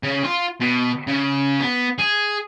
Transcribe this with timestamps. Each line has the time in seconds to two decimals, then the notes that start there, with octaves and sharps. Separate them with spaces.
0.03 C#3
0.24 F4
0.60 B2
1.07 C#3
1.60 B3
1.98 G#4